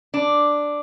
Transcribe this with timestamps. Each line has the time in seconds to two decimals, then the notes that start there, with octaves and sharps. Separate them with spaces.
0.14 D4